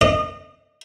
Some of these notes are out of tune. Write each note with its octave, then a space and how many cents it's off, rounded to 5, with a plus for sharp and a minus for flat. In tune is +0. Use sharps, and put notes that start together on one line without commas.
D#5 -25